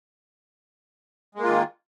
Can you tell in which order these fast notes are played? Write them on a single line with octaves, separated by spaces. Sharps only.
G#3 A#3 F4 D#3